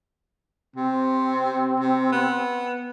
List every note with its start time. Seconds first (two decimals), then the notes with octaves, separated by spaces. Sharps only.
0.76 C3 C4
1.80 C3
2.12 B3